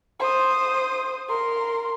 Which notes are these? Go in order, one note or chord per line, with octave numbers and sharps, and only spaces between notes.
C5 D#6
A#4 C6